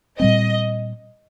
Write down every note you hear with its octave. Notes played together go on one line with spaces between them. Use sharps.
A#2 G3 C4 D#5